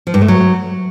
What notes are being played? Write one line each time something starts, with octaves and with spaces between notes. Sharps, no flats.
F3
G2
A3
F#3